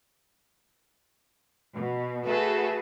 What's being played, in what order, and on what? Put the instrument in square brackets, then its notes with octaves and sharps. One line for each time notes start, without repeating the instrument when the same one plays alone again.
[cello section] B2
[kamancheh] A3 A4 [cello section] F#4 G#4 B4